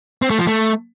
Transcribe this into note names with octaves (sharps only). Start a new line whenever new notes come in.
C4
A3
F3
A3